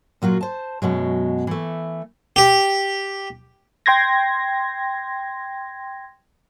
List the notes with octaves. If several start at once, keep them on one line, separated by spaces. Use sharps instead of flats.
A#2 F#3 F4 F#4
C5 A5
F#2 B2 F#3 G#3
E3 A3
G4
G5 C6 G#6 A#6